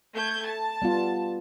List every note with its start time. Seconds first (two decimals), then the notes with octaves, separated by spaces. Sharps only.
0.15 A3 G6 G#6
0.46 A5
0.82 G3 B3 F4